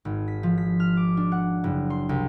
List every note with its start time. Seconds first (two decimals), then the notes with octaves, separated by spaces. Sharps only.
0.05 G#1
0.28 B6
0.43 F3
0.57 B6
0.80 F6
0.97 D6
1.17 D4
1.32 F#5
1.64 F#1
1.90 C6
2.09 C2